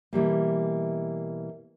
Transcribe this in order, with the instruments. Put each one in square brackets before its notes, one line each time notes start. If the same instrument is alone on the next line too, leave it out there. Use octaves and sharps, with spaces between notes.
[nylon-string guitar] B2 E3 G3 A#3